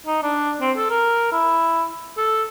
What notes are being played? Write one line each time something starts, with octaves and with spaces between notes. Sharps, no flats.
D#4
D4
C4
A4
A#4
E4
A4